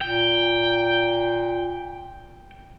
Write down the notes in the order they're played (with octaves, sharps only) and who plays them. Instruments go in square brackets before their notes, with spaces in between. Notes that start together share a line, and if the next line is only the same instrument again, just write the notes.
[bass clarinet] A#2 [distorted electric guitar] G5